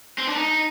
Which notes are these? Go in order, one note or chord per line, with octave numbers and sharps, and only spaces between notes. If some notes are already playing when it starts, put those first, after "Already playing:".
C4
D4
D#4